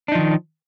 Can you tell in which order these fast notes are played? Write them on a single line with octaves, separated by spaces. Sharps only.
D4 D#4 F3 D#3